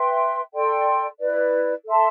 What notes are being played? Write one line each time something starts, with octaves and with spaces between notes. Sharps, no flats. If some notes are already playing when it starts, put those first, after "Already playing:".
Already playing: B4 E5 G5 C6
A4 D5 G5 C6
E4 B4 D5
A4 E5 A5 C6